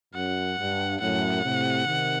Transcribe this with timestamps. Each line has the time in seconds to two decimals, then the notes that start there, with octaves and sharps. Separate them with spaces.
0.14 F#2 F#5
0.58 G2
1.00 F#2 A2 F#5
1.44 A2 C3
1.87 C3 D#3